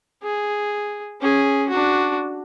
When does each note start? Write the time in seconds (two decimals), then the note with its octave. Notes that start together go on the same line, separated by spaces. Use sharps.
0.23 G#4
1.21 C#4 G#4
1.69 D4 F#4